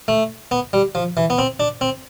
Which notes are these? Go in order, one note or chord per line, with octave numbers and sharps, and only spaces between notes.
A3
B3
G3
F3
E3
B3
C4
D4
C4